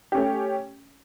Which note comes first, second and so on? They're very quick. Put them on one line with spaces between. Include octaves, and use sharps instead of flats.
G4 C#4 A3